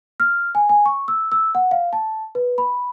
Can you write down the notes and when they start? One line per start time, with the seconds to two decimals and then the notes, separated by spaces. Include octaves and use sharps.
0.20 F6
0.55 G#5
0.69 G#5
0.86 C#6
1.08 E6
1.32 E6
1.55 F#5
1.71 F5
1.93 A5
2.35 B4
2.58 B5